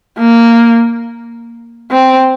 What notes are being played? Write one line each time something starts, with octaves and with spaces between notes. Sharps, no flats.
A#3
C4